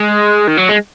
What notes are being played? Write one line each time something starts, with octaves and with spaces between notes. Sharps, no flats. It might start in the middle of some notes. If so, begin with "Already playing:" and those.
Already playing: G#3
D#3
F#3
G#3